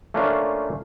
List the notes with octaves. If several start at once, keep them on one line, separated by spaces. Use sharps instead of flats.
A3 A#3 C#4 D4 F4 C5